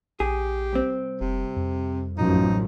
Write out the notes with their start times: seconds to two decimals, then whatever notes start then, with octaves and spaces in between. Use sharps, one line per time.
0.20 A#1 G4 G#4
0.73 C2 C4
1.21 F1 C3
1.56 F2
2.18 A1 F#2 F3 D#4